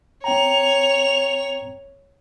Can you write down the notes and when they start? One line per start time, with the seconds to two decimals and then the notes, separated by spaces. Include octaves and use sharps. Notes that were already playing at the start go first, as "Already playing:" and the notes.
0.24 C4 C#5 G5 A#5 F7